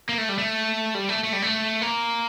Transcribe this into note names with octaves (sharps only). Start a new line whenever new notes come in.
A#3
A3
G3
A3
G3
A3
A3
G3
A3
A#3